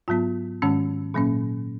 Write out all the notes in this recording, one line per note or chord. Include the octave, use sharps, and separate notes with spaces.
G#2 F#3 B3 F4
G#2 D#3 G#3 C#4
A#2 F#3 A#3 C#4